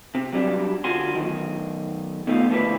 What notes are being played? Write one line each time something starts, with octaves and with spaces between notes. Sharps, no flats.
C3
F#3 G3 C#4 D4
D3 F4 F#4 G#5 C6
F#2 D#3
B2 A3 D#4 F4
F2 A2 D3 A#3 E4 B4